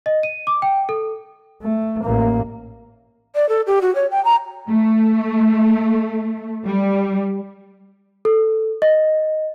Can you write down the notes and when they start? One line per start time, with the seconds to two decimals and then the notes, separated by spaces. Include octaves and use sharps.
0.06 D#5
0.23 D#7
0.47 D6
0.62 G5
0.89 A4
1.62 A3
2.04 A1 A#3
3.35 D5
3.49 A4
3.67 G4
3.82 F#4
3.95 C#5
4.11 G5
4.25 A#5
4.70 A3
6.66 G3
8.25 A4
8.82 D#5